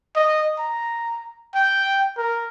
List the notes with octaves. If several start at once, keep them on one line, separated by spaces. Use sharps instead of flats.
D#5
A#5
G5
A#4